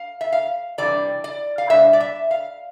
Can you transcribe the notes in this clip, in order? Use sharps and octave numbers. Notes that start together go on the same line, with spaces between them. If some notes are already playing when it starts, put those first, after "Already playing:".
Already playing: F5
E5
F5
C3 E3 G3 D4 D5
D5
F5
B2 G3 D4 E5
D5
E5
F5